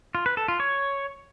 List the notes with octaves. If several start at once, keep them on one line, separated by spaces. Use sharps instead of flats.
F4
B4
A4
F4
C#5